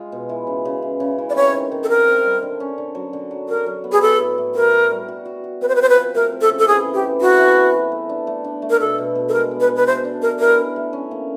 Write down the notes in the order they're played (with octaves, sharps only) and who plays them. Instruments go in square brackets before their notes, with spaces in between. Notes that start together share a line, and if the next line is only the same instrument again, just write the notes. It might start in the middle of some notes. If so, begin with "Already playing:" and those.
Already playing: [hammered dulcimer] G#3 F4
B2
E3
C#3
C#3
E3
C#3
E3
[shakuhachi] D5
[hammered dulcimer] C4 [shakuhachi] C#5
[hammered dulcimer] D#3
D#3
[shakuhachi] A4
[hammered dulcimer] C4 [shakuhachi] A#4
[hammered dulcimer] C4
G3
D3
C#4
D3
F#3
D3
F#3
[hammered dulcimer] F#3 [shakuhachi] A#4
[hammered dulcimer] F#3
B3
[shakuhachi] G#4
[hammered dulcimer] B3 [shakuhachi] A4
[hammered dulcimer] A2
A2
[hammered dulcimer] F#4 [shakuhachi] A#4
[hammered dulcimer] F#4
G3
F#4
F#4
F#4
[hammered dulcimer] C4 [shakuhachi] B4
[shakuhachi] C5
B4
[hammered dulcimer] C4 [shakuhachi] C5
[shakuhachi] B4
[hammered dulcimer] F3
[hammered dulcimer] A3 [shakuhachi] A#4
[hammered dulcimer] C4
[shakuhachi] A4
[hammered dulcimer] C#3
[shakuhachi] A4
[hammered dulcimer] E3 [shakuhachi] G#4
[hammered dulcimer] E3
[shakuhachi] G4
[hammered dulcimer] E3
[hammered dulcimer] E3 [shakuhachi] F#4
[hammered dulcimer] E3
B3
E3
A3
D4
A3
D4
A3
[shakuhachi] A#4
[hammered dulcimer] B2 [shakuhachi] A4
[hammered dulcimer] B2
B2
[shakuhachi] A4
[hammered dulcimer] G#3 [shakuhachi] A#4
[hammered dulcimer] B3
[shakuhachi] B4
[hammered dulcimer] B2
[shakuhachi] B4
[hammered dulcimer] A3 [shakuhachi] C5
[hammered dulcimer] D4
[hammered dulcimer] D4 [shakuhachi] A#4
[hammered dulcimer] E3 [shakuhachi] A#4
[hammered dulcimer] D4
A3
C#4
A#3